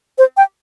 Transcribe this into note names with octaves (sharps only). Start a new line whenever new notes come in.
C5
G5